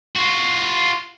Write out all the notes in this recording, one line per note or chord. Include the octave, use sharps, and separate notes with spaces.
F4 F#4